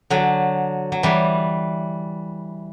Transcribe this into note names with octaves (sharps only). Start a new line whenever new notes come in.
D3 F#3
F#3
E3 G3